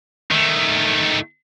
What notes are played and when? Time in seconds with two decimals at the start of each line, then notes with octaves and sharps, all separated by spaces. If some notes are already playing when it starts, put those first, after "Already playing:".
0.31 D#3 A3